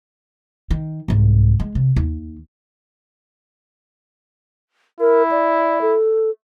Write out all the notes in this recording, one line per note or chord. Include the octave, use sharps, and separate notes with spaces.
D#3
C2 G#2
G#3
C3
D#2
E4 A#4
D5
A4